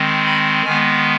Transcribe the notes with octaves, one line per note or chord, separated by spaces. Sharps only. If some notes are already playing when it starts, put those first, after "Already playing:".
Already playing: D#3 G#3 C4
B5
D#3 G#3 B3 G#5